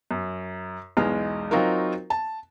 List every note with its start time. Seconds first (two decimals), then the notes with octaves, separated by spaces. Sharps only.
0.11 F#2
0.97 B1 E2 G#3 F6
1.51 F#3 C4 D#4 F4 F#4 A#4
2.10 A5